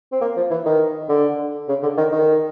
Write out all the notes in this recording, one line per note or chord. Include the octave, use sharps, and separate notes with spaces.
C4
A#3
F3
E3
D#3
D3
C#3
D3
D#3
D#3